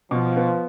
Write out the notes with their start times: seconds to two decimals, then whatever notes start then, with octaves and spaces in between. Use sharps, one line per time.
0.11 B2 F3
0.36 B3